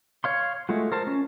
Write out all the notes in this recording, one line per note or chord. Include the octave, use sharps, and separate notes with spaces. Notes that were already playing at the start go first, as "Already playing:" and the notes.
C#5 F5 C6
G#3 A3 F4 F#4
A#4 C5 A5
C#4